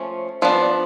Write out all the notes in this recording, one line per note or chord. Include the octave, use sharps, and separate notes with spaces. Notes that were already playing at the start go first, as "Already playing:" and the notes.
Already playing: F3 A3 C#4
F3 B3 D4